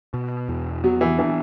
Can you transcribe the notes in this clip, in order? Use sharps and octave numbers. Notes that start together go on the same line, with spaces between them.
B2
E2
F#3 B3
E3
E3 D4